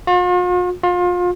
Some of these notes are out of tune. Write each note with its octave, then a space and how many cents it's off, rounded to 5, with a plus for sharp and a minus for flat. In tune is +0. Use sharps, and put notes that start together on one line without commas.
F4 +45
F4 +30